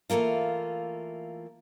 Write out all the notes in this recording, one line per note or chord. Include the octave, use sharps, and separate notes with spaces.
E3 F3 A3 A#3 F4